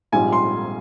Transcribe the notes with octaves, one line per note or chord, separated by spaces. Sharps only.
A#1 G#2 G3 C4 F4 G#5
C6